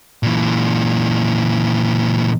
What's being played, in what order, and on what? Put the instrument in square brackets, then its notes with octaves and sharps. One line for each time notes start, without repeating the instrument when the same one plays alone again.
[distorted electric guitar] A#2 E3